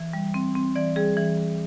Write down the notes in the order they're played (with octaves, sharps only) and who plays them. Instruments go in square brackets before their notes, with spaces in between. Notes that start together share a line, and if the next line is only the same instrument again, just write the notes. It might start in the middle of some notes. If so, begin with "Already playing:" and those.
Already playing: [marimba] E3
G3
C4
C4
E3 D5
G3 G#4
E3
E3